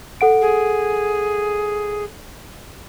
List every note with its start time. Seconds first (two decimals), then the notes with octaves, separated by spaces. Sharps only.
0.21 A4 F#5 D7
0.41 G#4